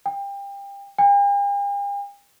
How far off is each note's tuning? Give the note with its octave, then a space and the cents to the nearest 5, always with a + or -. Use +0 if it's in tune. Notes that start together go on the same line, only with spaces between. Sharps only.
G5 +30
G5 +45